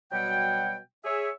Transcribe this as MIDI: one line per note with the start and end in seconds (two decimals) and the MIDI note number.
0.12 0.77 47
0.12 0.77 54
0.12 0.77 55
0.12 0.77 78
0.12 0.77 79
1.05 1.29 68
1.05 1.29 73
1.05 1.29 76